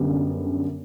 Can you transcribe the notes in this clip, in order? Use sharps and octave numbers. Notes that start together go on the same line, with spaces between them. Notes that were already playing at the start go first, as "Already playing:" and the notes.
Already playing: F#2 D3 G3 B3